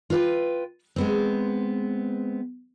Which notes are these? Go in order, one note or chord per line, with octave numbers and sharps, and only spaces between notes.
F4 B4 G5
G#3 B3 C4